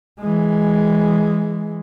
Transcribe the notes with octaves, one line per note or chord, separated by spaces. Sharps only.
E3 G#3